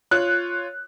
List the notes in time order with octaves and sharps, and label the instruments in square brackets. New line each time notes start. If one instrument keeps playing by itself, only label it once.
[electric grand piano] F4 C#5 [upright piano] F#6